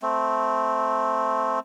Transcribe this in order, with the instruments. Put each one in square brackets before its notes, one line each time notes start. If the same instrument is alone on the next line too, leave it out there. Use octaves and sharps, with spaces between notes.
[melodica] A3 C4